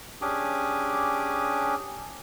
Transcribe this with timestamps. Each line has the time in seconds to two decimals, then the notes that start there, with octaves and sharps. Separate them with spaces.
0.22 C#4 D4 G4 G#4 G#5 D6